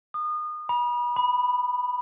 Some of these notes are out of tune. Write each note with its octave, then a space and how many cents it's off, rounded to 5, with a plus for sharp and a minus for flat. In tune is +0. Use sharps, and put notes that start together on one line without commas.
D#6 -30
B5 -35
B5 +0